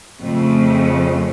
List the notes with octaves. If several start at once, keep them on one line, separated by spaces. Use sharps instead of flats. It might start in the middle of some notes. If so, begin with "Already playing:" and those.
F2 C#3 A3